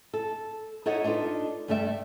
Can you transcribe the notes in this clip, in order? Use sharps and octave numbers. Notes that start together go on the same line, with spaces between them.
A4
D#4 E4 A4 C#5 D#5 F#5
D4 D#4 F4 A4 B4
G2 G3 A3 D5 E5 G5